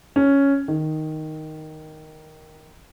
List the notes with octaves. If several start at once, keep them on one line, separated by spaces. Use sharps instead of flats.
C#4
D#3